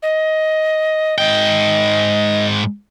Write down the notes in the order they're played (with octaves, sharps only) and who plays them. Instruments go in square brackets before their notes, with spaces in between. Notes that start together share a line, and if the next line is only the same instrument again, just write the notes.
[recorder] D#5
[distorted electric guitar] G#2 G5 [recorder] D#5